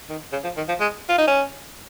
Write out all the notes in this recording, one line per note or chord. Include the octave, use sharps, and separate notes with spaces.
D#3
C#3
F3
D#3
F3
G#3
F4
D#4
C#4